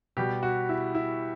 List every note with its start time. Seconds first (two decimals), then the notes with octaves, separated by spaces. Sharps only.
0.17 B2 G3 G4
0.43 F#4
0.69 E4
0.95 E4